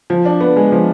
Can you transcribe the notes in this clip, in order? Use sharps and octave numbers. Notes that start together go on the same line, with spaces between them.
F3
D4
B3
G#3
F3